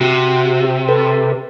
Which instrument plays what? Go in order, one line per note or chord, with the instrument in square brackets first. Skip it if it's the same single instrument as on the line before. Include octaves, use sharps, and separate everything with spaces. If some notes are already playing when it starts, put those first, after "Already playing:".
[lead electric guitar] C3 [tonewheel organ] F#4
[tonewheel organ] A4 B4